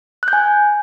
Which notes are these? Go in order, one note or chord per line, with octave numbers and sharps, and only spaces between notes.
F#6
G6
G#5